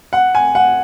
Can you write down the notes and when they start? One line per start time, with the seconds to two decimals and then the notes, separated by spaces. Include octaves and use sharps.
0.13 F#5
0.35 G#5
0.55 F#5